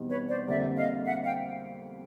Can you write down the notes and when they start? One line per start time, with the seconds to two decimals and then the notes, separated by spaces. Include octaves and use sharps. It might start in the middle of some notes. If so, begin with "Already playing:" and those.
Already playing: E2 B2 G3 C4 D#4
0.09 B4 C#5
0.28 C5 D5
0.47 F2 D3 G3 A#3 D5 E5
0.76 D#5 F5
1.06 E5 F#5
1.25 F5 G5